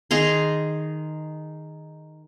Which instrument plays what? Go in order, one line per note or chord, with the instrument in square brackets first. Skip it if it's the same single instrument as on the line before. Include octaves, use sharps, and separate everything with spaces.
[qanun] D#3 G#4 A#5 C6